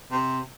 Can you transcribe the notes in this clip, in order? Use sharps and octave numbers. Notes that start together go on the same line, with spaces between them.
C3